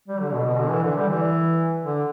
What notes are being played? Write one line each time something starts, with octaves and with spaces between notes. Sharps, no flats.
G3
D3
B2
B2
D3
E3
D3
G3
E3
D3